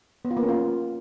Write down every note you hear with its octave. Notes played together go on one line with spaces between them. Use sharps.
B3
F4
A#3
C#4
F4